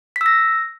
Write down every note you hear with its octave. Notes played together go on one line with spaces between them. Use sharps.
B6
E6
A#6